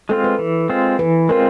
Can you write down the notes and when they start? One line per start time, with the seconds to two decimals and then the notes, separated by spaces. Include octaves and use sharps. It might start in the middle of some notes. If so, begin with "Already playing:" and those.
0.09 G#3 C4 F4 A4
0.24 B4
0.39 E3
0.70 G#3 C4 F4
0.99 E3 B4
1.29 G#3 C4 F4 A#4